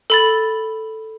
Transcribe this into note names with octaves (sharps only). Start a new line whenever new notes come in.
A4 B5 A6